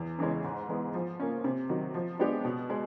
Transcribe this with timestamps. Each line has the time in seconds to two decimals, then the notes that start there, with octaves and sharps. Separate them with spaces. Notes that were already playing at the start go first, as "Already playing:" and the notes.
Already playing: E2
0.18 C#3 E3 G#3 C#4
0.44 G#2
0.69 E3 G#3 B3
0.94 F3
1.20 A#3 C#4
1.44 C3
1.69 D#3 F#3
1.94 F3
2.19 G#3 B3 D4 G4
2.45 B2
2.70 G#3